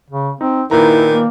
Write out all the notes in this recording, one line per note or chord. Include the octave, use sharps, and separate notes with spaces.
C#3
C4 D#4
A#2 D#3 E4 B4 A#5
A#3